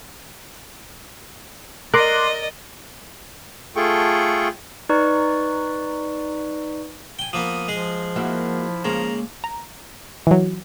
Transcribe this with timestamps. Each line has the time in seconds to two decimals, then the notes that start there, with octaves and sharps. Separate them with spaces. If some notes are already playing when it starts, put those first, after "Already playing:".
1.94 A#4 D5 D#5 C6 D6 F#6
3.76 A3 F4 G#4 A4 G5 C#6
4.89 D#4 B4 D5 C#6
7.19 G5 G#5
7.33 F3 A#3 B3 D#6
7.68 F3 G#3 G#4
8.16 A#3 E4 F#4 E5
8.84 C#3 G#3 A#3 A#5
9.44 A#5
10.27 E3 F#3